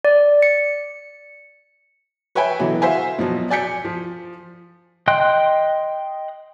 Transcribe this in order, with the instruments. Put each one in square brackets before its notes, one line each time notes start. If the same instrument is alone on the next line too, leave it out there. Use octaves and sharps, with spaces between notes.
[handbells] D5
C#7
[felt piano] B4 C#5 E5 G5 G#5 B5
B2 D3 E3 F#3
F#4 C5 E5 F5 G#5
B2 F3 F#3
D5 G#5 G6 B6 C#7
F3
[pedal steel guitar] D#5 G5 C6 F#6